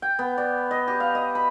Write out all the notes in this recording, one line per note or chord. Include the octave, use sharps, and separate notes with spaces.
G5
B3
D5
D#5
G4
F5
D#5
B5